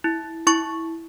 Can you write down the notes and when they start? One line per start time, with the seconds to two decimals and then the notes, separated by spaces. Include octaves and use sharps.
0.04 E4
0.47 E4 C#6